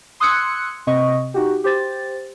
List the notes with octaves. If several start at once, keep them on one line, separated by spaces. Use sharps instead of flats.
C6 D#6 E6 F#6 G#6 C#7
C3 C4 D#5 C#6
D#4 F#4 G4
G4 C5 A6